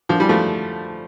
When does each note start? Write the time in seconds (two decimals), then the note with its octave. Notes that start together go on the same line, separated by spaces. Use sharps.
0.09 D3 F3
0.20 E3 G3
0.29 F3 A3